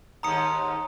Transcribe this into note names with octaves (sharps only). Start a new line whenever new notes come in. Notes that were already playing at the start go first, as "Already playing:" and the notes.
D#2 G#2 A#5 D#6 C#7